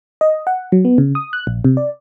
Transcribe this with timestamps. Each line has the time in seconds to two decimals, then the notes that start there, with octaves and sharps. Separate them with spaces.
0.21 D#5
0.47 F#5
0.72 F#3
0.85 B3
0.98 C#3
1.15 D#6
1.33 F#6
1.47 A#1
1.64 C3
1.77 D5